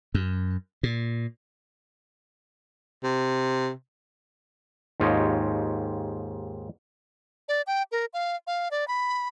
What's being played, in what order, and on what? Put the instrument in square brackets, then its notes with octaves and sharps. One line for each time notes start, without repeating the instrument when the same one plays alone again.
[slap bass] F#2
A#2
[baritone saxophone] C3
[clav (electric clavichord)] D#2 G#2 F4 G4 C#5 D#5
[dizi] D5
G5
A#4
F5
F5
D5
B5